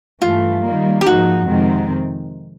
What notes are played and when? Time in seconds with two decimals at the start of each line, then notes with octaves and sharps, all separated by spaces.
0.22 G2 E3 A3 F4
0.64 D#3 G3 A#3
1.01 G4
1.06 G#2 F3 A#3 D#4 F#4
1.48 F2 C3 D#3 G#3 C4